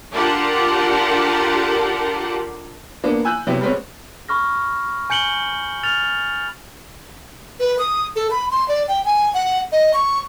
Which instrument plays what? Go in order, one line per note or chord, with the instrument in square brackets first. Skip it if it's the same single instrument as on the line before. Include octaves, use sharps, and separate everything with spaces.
[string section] D4 F4 G4 A4 A#4 F#5
[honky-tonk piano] A#3 B3 D4
G#5 E6 F#6 G6
C3 F#3 B3 E4 G4
G3 G#3 B3 C4 C#5
[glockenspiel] B5 C#6 F6 A#6
G#5 G6 C#7 F#7 G7
F6 A6 F7
[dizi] B4
D#6
A4
B5
C6
D5
G5
G#5
F#5
D#5
C#6